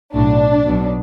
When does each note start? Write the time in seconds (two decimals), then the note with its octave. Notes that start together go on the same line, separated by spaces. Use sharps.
0.12 B1 A2 F#3 D4
0.66 B1 B2 F#3